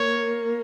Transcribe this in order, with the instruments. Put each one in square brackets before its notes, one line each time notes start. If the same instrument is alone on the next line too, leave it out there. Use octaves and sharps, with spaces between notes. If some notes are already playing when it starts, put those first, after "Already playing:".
Already playing: [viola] A#3 [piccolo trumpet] C#5